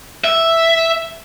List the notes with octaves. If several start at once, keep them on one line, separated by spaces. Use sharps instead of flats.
E5